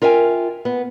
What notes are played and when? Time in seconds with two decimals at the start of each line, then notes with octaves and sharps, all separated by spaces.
0.02 F4 A#4 E5 G5 G#5
0.65 B3